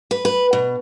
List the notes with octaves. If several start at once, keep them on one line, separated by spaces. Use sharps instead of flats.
B4
B4
B2